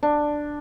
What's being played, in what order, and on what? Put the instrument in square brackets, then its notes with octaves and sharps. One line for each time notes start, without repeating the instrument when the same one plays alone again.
[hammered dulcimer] D4